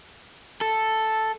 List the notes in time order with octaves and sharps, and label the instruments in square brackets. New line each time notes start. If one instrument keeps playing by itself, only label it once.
[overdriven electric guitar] A4